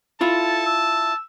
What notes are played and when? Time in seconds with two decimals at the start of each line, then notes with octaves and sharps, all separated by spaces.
0.21 E4 F4 A4 A5
0.66 E6